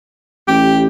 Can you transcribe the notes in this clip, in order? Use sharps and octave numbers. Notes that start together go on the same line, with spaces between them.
A1 G4